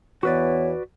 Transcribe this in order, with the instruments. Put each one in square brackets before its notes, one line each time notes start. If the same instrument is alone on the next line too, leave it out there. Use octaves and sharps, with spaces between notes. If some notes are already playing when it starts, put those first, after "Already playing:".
[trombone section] E2 E3 B3 [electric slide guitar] F#4 B4 D5 [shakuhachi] C#5